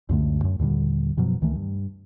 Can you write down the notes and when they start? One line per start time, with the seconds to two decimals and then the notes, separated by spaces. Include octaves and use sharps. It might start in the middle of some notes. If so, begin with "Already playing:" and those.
0.09 C#2 F#2 D3 A3
0.44 F#2
0.59 D#2 A#2 D3 G3
1.17 F#2 B2 F3 F#3
1.41 C#2 D#3 E3 A3
1.56 G2